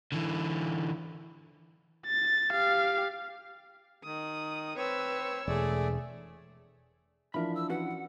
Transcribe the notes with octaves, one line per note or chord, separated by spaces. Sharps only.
D3 E3
A6
G4 F5
D#3 D#6
C4 B4 C#5 E6
E1 A3 G#4 D5
E3 F3 D4 A#4 E5 B5
E6
C#4 F#4 B4 F#5